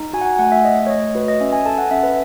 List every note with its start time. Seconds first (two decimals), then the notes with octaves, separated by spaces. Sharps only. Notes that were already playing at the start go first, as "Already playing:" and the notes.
Already playing: D#4
0.13 F#4 G#5
0.21 F#5
0.26 G#5
0.39 A3 F#5
0.52 E5
0.65 A3 D#5
0.86 C#5
0.90 A3 D#5
1.15 F#4 B4
1.28 D#5
1.40 C#4 E5
1.53 G#5
1.66 A4 A5
1.78 F#5
1.91 C#4 E5
2.03 B4